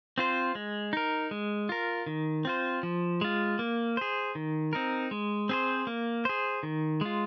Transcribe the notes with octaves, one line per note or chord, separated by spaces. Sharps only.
C4 F4 C5
G#3
D#4 A#4
G#3
F4 A#4
D#3
C4 F4 C5
F3
G#3 F4
A#3
G#4 C5
D#3
C4 D#4 A#4
G#3
C4 G#4 C5
A#3
G#4 C5
D#3
G#3 F4